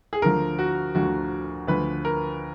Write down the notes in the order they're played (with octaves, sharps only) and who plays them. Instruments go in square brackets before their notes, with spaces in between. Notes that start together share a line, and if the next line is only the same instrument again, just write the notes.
[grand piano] G#4
D2 D3 F3 A#4
F#4
D2 D3 F3 F#4
D2 D3 F3 B4
A#4